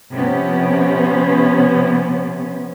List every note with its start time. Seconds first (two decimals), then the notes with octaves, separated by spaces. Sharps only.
0.13 C3 F3 B3 C#4